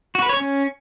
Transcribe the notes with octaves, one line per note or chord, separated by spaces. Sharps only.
F#4
B4
C#5
C#4